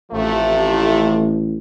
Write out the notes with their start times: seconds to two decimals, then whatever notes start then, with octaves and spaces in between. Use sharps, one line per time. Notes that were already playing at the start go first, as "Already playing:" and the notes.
0.12 A1 C3 F3 A3